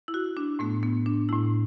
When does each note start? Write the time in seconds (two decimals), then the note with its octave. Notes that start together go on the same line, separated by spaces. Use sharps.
0.08 E4
0.14 F#4
0.37 D4
0.59 A2 A3 B3
0.83 B3
1.06 D4
1.29 A2 A3 E4